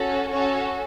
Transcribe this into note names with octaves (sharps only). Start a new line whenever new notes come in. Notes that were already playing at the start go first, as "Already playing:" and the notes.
Already playing: C#4 F#4 A4
C#4 F#4 A4 C#5